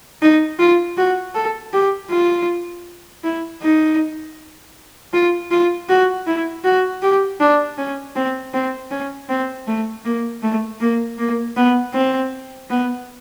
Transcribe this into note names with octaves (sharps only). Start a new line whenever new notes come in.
D#4
F4
F#4
A4
G4
F4
E4
D#4
F4
F4
F#4
E4
F#4
G4
D4
C#4
C4
C4
C#4
C4
A3
A#3
A3
A#3
A#3
B3
C4
B3